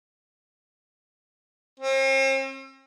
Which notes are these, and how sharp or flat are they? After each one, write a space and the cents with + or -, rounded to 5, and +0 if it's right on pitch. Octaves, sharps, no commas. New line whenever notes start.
C4 +45